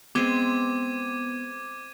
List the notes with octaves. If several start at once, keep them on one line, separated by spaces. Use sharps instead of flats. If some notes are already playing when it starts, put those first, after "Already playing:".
G#3 B3 C4 D6 G#6 D#7